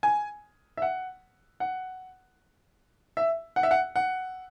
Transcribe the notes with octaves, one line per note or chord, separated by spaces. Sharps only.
G#5
E5
F#5
F#5
E5
F#5
E5
F#5
F#5